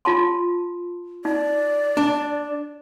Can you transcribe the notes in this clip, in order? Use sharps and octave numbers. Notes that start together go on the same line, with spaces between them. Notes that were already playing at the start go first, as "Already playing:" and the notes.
F4 A5 C6
D#4 D5
D4